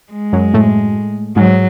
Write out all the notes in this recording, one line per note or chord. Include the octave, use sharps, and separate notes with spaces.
G#3
F#2 F#3
A2 A3
G#2 F#3 G#3